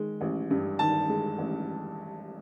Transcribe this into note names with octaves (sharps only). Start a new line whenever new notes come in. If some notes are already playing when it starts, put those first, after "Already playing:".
Already playing: D#3 G#3
A1
G2
D#3 A5
G#3
A1